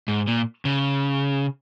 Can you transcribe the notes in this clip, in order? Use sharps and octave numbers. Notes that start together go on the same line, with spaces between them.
G#2
A#2
C#3